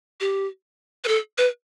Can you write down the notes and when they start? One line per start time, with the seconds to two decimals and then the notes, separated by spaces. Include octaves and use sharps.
0.20 G4
1.04 B4
1.08 A4
1.38 B4